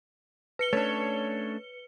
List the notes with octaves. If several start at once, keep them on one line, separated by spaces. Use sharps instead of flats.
B4 C#7 G7
A3 C#4 D4 C#5